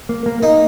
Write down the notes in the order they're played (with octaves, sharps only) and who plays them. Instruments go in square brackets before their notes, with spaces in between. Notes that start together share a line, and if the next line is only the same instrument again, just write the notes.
[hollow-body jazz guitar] A#3
A#3
[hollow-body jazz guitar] A#3 [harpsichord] D#4